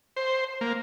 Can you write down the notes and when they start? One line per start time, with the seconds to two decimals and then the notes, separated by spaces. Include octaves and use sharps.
0.16 C5
0.61 A#3